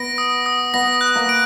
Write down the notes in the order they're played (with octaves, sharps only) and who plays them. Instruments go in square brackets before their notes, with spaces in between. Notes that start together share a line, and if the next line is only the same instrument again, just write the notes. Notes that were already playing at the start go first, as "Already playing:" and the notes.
Already playing: [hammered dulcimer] B3 [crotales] A#6 D7
[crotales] D#6
D#6
[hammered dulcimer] B3 [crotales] A#6
[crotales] F#6
[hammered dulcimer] A#3
[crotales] D7